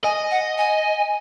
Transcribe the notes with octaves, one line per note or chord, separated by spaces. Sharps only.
D#5 G#5
F#5
G#5